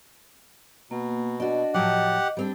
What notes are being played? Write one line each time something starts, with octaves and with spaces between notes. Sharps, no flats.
B2 A#3
D4 F#4 D#5
A2 F3 F#3 G4 F#5
G3 C4 D4